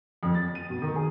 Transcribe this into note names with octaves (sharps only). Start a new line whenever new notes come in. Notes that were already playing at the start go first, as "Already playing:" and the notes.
F2
A6
D#7
B2
D#3
G#4